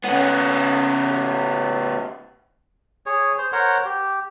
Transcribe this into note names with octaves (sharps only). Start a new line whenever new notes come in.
C#3 B3
G#4 C#5
C5
A#4 C5 C#5 F#5
G4